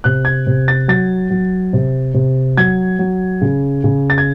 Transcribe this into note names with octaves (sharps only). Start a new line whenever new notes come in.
C3 F#6
G#6
C3
A6
F#3 A6
F#3
C3
C3
F#3 G#6
F#3
C#3
C#3
A6
G#6